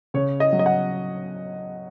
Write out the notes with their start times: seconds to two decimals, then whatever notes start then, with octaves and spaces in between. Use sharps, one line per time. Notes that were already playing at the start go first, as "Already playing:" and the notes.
0.14 C#3 C#5
0.40 D#5
0.53 F#3
0.59 D#5
0.66 F#5